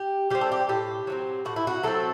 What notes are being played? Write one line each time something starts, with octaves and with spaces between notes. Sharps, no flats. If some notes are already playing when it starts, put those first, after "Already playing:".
Already playing: G4
G3 C4 G4
A4
G4
A2 G4
F#3 A3 C4
A2 F#4
E4
F#4
F#3 A3 C4 A4